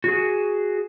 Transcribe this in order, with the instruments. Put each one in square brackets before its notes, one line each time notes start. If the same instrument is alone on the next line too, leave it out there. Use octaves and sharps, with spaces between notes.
[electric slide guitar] F#4 G#4